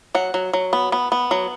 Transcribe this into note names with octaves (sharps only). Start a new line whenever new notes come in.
F#3 F#5
F#3
F#3
B3
B3
B3
F#3